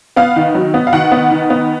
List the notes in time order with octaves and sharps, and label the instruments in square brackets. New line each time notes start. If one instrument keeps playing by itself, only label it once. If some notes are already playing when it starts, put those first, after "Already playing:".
[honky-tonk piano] B3 F5
D#3
F#3
B3
F5
D#3 F#5
B3
D#3
B3